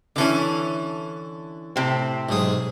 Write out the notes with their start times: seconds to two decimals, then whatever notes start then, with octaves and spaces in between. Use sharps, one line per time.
0.16 D3 E3 C#4 E4 A4 D6
1.76 A2 C3 C4
2.29 B1 G#2 G#4